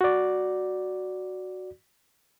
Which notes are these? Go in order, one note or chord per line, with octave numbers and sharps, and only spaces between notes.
F#4 D5